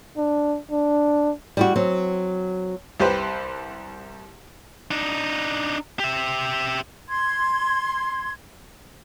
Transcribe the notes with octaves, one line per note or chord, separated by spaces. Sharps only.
D4
D4
G3 E4 F#4
F#3 C4
C2 G4 B4 C5
D4 D#4
G4 E5
C6 G#6